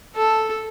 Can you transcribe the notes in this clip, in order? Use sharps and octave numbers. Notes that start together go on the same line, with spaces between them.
A4